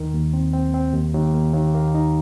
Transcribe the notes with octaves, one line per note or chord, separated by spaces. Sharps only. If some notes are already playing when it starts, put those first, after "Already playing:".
Already playing: D#2 D#3
D#2
C4
C4
C4
D#2
D#2
A#3
D#2
A#3
D#4